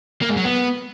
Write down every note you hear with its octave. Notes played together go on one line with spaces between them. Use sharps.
A#3
G#2
F#3
B3